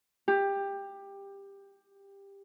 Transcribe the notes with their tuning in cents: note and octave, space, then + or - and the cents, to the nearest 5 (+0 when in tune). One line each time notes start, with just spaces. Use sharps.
G4 +15